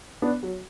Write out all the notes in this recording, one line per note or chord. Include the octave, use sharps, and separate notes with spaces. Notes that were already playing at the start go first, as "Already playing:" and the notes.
B3 D4
F#3